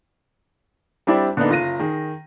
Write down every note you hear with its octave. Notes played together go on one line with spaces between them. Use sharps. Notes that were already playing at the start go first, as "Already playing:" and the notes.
G3 C4 D4 E4 G4
D3 A#3 B3 D4 D#4
F#1 F4 A#6 D#7
D#3 G#4